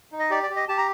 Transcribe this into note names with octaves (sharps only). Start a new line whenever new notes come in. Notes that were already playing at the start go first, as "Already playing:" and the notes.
D#4
D#5
G4 D5
D5
G4
D#5
G4 A5
A#5